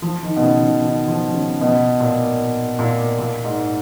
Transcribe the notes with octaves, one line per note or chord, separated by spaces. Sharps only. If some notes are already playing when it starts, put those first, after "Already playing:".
F3
D#3
B2
C#3
C#3
D#3
F3
C#3
B2
A#2
A#2
A#2
G#2